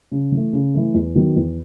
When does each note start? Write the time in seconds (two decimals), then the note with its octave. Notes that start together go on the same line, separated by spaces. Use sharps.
0.12 C#3
0.32 E3
0.37 A3
0.53 C#3
0.74 E3 A3
0.94 E2
1.15 D#3 F#3 B3
1.36 E2